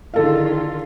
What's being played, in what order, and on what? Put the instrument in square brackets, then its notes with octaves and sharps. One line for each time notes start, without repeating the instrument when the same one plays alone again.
[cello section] D3 D#3 F4 [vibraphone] E4 G#4 [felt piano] A4 F5